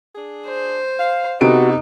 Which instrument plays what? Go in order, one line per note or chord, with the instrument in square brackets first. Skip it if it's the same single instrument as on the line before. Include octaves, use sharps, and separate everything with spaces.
[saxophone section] D4 G#4
[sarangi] C5
[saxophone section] F5
[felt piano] C3 B3 D7 [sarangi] D#4 [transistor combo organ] F#4 [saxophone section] A4